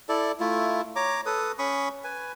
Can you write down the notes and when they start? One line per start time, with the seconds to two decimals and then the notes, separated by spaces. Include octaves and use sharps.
0.09 E4 A4 D5
0.40 A3 E4 F4
0.96 C#5 A#5 D6
1.26 A4 B4 D#6
1.59 C#4 B5 C#6 D#6
2.04 B4 G#5